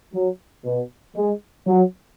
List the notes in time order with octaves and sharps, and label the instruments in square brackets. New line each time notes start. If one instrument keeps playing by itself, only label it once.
[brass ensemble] F#3
B2
G#3
F#3